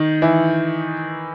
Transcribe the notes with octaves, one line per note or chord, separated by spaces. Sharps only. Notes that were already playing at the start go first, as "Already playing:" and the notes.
Already playing: D#3 D#4
E3 E4